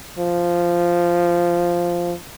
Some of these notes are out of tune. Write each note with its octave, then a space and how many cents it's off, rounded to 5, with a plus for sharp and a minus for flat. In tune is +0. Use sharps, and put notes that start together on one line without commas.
F3 -5